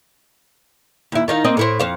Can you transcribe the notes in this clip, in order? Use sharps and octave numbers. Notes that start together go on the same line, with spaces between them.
D#2 E4
D#3 D#4 F5
A#3 C4 D#5
A2 E4 C5
F2 C5 F5